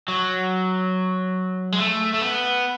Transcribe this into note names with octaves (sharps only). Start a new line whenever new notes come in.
F#3
G#3
A3
A3
B3